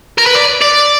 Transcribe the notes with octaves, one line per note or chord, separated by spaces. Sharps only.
A#4
B4
D5
D5